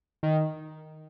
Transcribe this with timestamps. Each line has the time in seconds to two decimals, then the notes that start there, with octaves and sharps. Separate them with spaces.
0.23 D#3